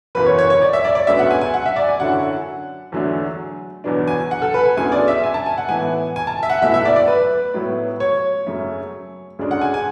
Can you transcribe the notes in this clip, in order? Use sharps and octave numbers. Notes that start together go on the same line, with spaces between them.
F#1 E2 B2 B4
C#5
C#5
C#5
D5
E5
D5
D5
D2 C#3 F#3 B3 E5
F#5
G#5
G#5
F#5
E5
D5
G#5
F#2 D3 F#3 C#4 E4 F#5
E2 D3 F#3 A3
E2 B2 F#3 B3 D4
G#5
F#5
A4
B4
G#5
D2 C#3 F#3 B3 E4 G#5
D5
E5
G#5
A5
G#5
F#5
A2 E3 B3 E4 G#5
G#5
A5
E5
F#5
B1 B2 A3 E4 E5
E5
D5
D5
B4
A2 F#3 B3 E4
C#5
F#2 C#3 F#3 A3
D2 C#3 G#3 D4
F#5
G#5
G#5